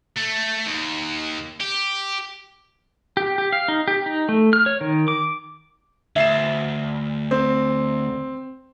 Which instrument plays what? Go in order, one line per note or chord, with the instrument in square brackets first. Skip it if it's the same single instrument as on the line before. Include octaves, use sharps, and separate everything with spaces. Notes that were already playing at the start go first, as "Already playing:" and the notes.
[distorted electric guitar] A3
D#2
G4
[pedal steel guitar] G4
G4
F5
D#4
G4
D#4
A3
F6
C#5
D#3
D6
[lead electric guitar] D2 [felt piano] E5 C7 E7
[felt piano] C4